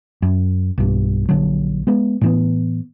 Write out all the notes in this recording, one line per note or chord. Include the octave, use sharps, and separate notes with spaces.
F#2
B1 G2
A#1 D3 F#3
G#3 B3
A2 E3 B3